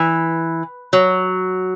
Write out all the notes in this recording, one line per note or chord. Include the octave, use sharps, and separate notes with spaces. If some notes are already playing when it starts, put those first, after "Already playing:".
Already playing: E3
F#3